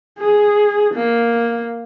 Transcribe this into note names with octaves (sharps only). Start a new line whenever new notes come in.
G#4
A#3